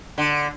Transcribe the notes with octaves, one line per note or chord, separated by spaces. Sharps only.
D3